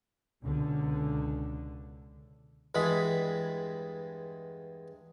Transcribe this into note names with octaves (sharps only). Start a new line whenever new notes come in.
C#2 B2 D3
E2 G2 G#3 B5